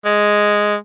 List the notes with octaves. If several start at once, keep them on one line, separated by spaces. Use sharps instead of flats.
G#3